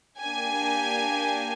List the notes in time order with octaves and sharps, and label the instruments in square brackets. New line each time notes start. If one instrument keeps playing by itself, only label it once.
[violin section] A#3 D4 G4 G#5